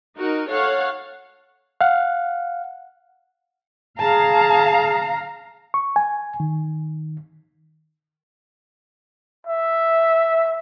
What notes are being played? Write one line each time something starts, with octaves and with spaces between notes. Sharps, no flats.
D#4 F#4 A#4
A4 C#5 F5 F#5
F5 F#5
G#4 F5 A5 A#5
C#6
G#5
D#3
E5